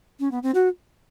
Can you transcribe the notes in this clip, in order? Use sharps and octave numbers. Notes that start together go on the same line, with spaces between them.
C#4
B3
C4
F#4